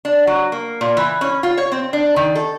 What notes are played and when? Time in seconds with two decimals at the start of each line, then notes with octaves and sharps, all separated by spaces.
0.05 D4
0.27 F#3
0.52 A#3
0.81 A#2
0.97 E3
1.21 C#4
1.43 F4
1.57 C#5
1.72 C4
1.93 D4
2.16 D#3
2.35 A4